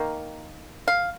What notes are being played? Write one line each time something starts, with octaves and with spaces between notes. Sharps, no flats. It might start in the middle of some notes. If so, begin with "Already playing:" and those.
Already playing: D#3 A#3
F5